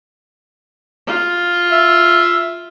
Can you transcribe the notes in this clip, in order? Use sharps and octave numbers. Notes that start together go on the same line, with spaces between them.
F4
E5